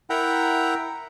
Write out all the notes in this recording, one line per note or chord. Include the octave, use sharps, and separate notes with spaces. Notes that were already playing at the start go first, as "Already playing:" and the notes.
E4 A#4 E5 F#5 G5 A#5